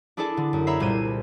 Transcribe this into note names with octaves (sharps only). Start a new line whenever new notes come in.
D4 E4 G#4 A4 D5 A5
D3
F#2
C#5 E5 A#5 B5 E6 C7
C2 A#2 C5 G#6 D#7